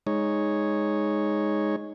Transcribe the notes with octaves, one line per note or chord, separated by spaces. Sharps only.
G#3 D#4 C#5